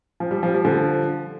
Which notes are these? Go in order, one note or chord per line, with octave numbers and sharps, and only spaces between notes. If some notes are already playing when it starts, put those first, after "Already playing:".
F3
G3
F3
G3
D3 F3